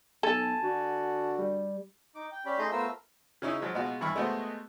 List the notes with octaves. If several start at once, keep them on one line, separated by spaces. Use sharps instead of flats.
B1 A4 G#5 A5
D3 F#4
G3
D#4 D6
G5
C#4 G4 D5 B5
A3 D#4 G#4 D#5 C6 G6
A3 B3 F4 A#4 C5 E6
C#3 C#4 D#4 E4
F3 F#3 G#3
B2 G#3 F4 F#4
G2 E3 B5 C#6 F6
G#3 A3 B3 F#4 C5 D#5